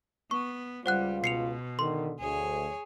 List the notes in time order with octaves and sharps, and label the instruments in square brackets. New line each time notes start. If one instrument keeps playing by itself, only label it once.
[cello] B3 [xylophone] C#6
[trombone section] C#2 F4 [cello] G3 [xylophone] C5 F#5 F#6
[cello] B2 [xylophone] C7 C#7 F7
[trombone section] D3 D#3 [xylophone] A4 C6
[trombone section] D2 [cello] G#4 C#5